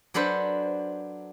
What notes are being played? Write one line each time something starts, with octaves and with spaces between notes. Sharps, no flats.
F#3 D4 A4 B4 C5